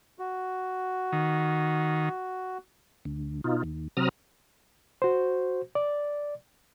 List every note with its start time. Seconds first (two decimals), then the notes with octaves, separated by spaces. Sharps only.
0.19 F#4
1.12 D#3
3.05 D2
3.44 B2 D#4 F4
3.64 D#2
3.97 C3 F#3 C4 A#5 D#6 F6
5.02 F#4 C5
5.75 D5